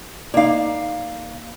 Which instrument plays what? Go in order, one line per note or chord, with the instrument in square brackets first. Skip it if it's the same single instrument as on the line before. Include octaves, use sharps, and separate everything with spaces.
[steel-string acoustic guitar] A#3 F5 [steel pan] D#4 D5